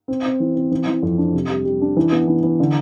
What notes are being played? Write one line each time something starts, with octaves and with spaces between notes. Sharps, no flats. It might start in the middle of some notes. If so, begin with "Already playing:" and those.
C4
C4
E3
C4
E3
E3
F2
D4
C3
G3
G3
D4
E3
B3
E3
E3
D3